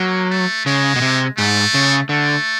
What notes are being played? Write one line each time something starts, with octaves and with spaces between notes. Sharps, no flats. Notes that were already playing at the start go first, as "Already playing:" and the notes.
Already playing: F#3 A#3
A3
C#3 G#3
B2
C3
G#2 A3
C#3
D3 A3